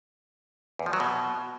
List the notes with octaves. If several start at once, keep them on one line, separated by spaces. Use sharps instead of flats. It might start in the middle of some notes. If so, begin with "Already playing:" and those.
E2
F3
F#3
B2